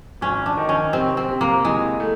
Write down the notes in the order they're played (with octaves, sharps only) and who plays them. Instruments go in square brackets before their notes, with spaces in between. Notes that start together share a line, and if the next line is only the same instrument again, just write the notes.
[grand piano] G#1 [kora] C#4
[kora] D4
[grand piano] D#3
[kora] C#4
[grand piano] C3 [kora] C4
[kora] C4
[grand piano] C3
[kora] A#3
[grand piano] E3 [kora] G#3
[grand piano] A3